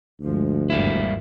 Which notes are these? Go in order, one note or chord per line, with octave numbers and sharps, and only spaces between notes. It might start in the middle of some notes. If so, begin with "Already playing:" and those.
D2 G2 F3 G#3
G#1 E2 G3 A#3 E4